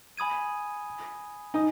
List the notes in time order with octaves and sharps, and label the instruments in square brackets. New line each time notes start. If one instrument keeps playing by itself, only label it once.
[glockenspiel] G#5 B5 D#6 G#6 D#7
[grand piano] D#4 [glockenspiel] G#5 D#6